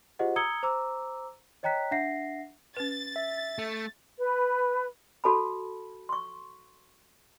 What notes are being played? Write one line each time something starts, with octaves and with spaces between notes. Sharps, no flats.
F4 G4 G#4 C5 D#5 F#5
A#5 D#6 E6 G#6 C#7 G7
C5 A#5 D6 E6
C#5 D#5 G5 A#5 F#6 B6
D4 E5 F#5 A#6 C7
C#4 B4 A6
E5
A3
B4
F#4 A4 A5 B5
C6 C#6